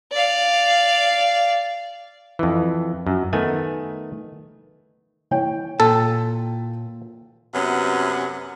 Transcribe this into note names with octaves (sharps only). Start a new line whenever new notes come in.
D5 F5
F2 E3
F#2
D#3 A3 B3 G#5
E3 C#5 G5
A#2 A4
F#2 C3 B3 C#5